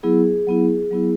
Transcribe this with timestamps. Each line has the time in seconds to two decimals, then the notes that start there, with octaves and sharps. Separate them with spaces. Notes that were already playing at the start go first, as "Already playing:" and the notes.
0.03 F#3 B3 E4 G#4
0.47 F#3 B3 E4
0.91 F#3 B3 E4